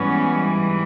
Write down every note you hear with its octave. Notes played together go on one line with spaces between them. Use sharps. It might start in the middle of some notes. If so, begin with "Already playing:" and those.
Already playing: G#2 E3 G3 B3 C#4